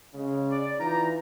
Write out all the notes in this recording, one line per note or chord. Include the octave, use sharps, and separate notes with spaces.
C#3 G#3
D5
E3 D#4 F4 A#5